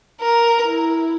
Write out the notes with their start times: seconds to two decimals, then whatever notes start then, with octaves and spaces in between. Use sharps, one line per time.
0.21 A#4
0.64 E4